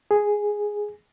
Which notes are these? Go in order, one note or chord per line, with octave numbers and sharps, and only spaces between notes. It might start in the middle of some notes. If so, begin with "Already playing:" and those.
G#4